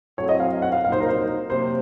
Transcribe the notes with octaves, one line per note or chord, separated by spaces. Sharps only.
A2 F#3 A3 C4 C#5
D#5
F5
F#5
F5
C2 A#2 F#3 A#3 D#4 F5
C5
A#4
C5
C3 F#3 A#3 C5